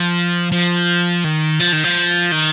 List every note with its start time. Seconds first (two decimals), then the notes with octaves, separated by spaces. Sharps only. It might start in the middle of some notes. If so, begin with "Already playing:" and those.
Already playing: F3
0.52 F3
1.24 D#3
1.60 F3
1.72 D#3
1.84 F3
2.31 D#3